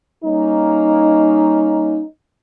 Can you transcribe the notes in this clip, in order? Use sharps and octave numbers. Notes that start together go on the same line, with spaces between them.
G3 A#3 C#4 D#4